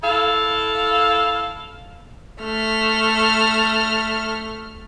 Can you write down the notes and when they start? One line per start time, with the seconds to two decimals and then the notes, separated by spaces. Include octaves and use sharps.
0.03 E4 A4 F5
2.42 A3 F6